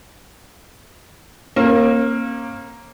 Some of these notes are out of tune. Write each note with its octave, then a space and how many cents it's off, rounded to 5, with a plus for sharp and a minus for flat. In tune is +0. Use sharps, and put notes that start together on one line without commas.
A#3 +0 C#4 -40